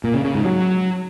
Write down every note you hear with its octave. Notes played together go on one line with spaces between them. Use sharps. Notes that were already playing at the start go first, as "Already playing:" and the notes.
A#2
C#3
C#3
G#2
F#3